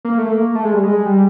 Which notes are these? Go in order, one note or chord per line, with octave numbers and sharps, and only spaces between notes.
A#3
A3
A#3
A3
G#3
G3
G#3
G3